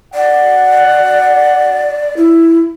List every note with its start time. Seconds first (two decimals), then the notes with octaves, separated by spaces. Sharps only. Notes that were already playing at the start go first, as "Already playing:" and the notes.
0.14 F#4 D5 F#5
2.17 E4